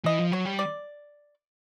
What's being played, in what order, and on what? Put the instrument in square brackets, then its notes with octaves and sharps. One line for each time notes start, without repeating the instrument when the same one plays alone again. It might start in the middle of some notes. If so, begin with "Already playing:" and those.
[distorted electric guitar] E3 [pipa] D#5
[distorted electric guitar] F3
[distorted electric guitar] F#3 [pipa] C#5
[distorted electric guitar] G3
[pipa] D5